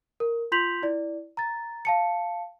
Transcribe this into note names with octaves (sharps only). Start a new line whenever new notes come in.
A#4
F4 C6 G6 B6 F7 F#7
E4 D5
A#5 A6
F5 A5 C#7